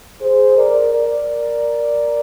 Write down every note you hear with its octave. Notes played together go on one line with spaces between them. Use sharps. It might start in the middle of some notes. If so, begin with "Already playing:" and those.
G#4 C5
A#4 D5
A#4 D5